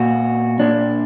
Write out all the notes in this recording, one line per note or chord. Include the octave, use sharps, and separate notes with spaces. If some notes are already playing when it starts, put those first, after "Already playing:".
Already playing: A#2 F#4
A#2 D4